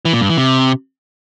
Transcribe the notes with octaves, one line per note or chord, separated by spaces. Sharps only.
E3
A#2
G2
E3
C3